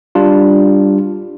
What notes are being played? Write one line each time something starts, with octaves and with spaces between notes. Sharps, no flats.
G3 D4 F4